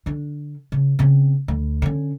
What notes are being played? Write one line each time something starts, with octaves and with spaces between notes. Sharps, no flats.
D3 D4
C#3
C#3 C4
D2
D3 C#4